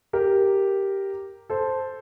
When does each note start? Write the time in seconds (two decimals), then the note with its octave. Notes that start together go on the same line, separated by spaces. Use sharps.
0.13 G4 A#4
1.50 A4 C5